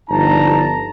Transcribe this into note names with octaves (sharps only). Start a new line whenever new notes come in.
G1 F3 D#4 A5 A#5